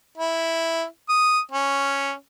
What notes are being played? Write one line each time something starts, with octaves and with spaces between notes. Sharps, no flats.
E4
D#6
C#4